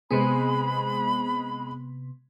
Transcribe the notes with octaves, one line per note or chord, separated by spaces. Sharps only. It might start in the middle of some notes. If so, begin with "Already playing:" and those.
C3 G#3 B3 C4 G#4 B5